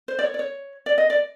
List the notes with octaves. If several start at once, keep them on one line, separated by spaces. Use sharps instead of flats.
C5
D5
C#5
D5
C#5
D5
D#5
D5